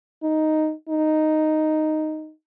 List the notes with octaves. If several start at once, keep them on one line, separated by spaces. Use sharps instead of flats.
D#4
D#4